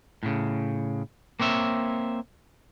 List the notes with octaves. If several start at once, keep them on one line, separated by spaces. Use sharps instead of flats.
A2 C#3
A#3 C4 C#5 E5